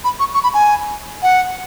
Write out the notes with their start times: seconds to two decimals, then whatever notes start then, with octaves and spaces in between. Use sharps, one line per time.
0.04 B5
0.20 C#6
0.34 C#6
0.43 B5
0.54 G#5
1.23 F#5